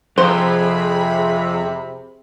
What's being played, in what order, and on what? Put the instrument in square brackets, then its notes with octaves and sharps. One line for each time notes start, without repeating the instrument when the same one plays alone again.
[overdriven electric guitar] F2 [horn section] C3 [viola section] G#4 B5 [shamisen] C5